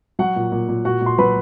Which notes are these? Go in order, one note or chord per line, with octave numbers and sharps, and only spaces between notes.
F#3 F#4 F#5
A#2
A#2
A#2
A#2 F#4 F#5
A#2 C6
F#3 B4 B5